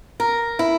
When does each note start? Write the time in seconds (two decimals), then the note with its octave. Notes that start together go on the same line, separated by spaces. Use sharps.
0.20 A#4
0.59 E4